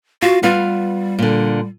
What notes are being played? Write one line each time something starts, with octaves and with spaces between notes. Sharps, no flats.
F4 F#4
G3 B3 F4
A#2 D3